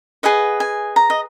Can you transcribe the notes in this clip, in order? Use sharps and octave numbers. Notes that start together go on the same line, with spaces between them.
G#4 B4 D#5 F#5
G#5
A#5
D#5